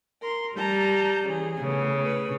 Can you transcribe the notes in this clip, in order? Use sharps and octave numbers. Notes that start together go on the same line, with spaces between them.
A#4 C6
G3 A5 A#5 G6
C#3 E3 G#4
A2 C#3 B3
B4